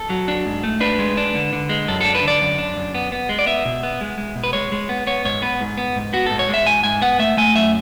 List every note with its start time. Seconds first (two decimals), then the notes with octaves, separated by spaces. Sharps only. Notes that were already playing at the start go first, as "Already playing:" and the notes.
Already playing: A4
0.10 F#3
0.28 D4
0.46 G#2
0.63 A3
0.80 D4 B4
0.99 G#3
1.17 D4
1.35 D3
1.53 D3
1.69 G#3
1.88 F#2 A4
2.01 D4 A4
2.15 B4
2.23 D3 D5
2.41 F#2
2.58 D4
2.77 F#2
2.95 B3
3.12 B3
3.29 G#3
3.39 D5
3.46 B3 E5
3.65 B2
3.83 B3
4.01 G#3
4.18 G#3
4.36 B2
4.44 B4
4.53 G#3 C#5
4.72 G#3
4.89 B3
5.07 B3 C#5
5.25 G#2 C#5
5.42 B3 B4
5.61 G#2
5.78 B3
5.96 G#2
6.13 B3 F#4
6.26 G#2 A4
6.39 C#5
6.49 G#3 E5
6.67 G#2 G#5
6.84 G#2 G#5
7.02 B3 F#5
7.19 A3 E5
7.37 A3 G#5
7.55 F#2 E5